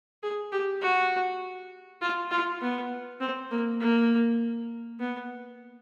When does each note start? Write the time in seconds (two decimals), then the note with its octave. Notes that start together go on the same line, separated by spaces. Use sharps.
0.23 G#4
0.52 G4
0.82 F#4
2.01 F4
2.31 F4
2.61 B3
3.21 C4
3.51 A#3
3.80 A#3
5.00 B3